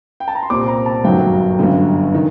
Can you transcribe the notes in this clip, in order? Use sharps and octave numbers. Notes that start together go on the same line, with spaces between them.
G5
A5
A#5
C6
C2 A#2 G3 C4 D6
A#5
A5
G1 F#2 D#3 F#3 G5
G1 F#2 D3
D#3